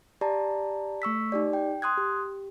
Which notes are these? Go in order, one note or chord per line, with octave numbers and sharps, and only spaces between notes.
G4 D5 A5 A#5
A3 C#6 E6 B6
D#4 G4 D5
G5
C6 D#6 F#6 G#6
G4